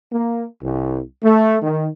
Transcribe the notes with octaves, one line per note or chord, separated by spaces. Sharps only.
A#3
C2
A3
D#3